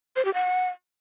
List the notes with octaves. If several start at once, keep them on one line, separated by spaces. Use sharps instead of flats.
C5
G4
F#5